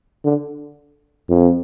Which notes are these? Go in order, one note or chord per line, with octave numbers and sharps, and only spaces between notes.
D3
F2